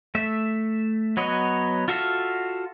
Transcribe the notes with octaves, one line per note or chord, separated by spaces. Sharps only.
A3 E5
F#3 B3 C#5 D#5
F4 F#4 A4 E5 F5